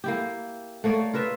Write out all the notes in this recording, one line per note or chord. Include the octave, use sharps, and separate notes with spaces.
A#3 E4 G4
A3 A#3 C#5 D5
F4 A#4 B4 E5